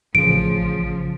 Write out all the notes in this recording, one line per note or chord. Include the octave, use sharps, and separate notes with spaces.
A1 C#3 F3 D7